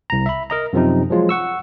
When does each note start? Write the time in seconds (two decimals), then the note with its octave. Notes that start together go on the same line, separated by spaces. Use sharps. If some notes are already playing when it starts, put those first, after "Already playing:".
0.10 C2 A#5
0.26 E5 B5
0.50 A#4 D#5 A#5
0.73 F#2 C3 F3 C4 D#4
1.10 F3 F#3 G#3 F4
1.29 F#5 C#6 E6